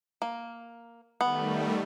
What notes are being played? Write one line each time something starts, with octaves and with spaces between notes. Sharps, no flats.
A#3
D#3 G3 A3 B3